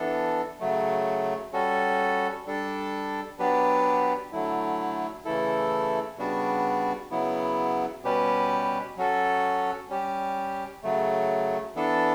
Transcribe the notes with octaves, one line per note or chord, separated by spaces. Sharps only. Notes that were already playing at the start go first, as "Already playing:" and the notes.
Already playing: E3 B3 D4 A4
C#3 F#3 A3
G3 C#4 F#4 A4
G3 D4 A4
F#3 B3 D4 G4 B4
D3 F#3 A3 E4
C#3 E3 A3 E4 A4
C#3 G3 B3 D4 F#4
C#3 F#3 B3 E4
B2 G3 C#4 G4 B4
F#3 C#4 F#4 A4
G3 C#4 G4
C#3 F#3 A3
E3 B3 D4 A4